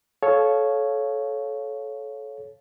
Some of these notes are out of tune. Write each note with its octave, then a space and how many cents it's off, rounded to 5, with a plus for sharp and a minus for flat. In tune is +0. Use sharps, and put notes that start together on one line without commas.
A4 -25 C#5 +0 F5 +0